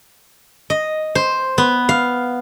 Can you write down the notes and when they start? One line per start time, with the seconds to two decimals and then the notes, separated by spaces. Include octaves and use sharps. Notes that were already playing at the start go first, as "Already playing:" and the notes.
0.70 D#5
1.15 C5
1.58 B3
1.89 F5